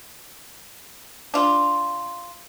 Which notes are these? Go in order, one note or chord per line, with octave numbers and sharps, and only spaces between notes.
D4 F4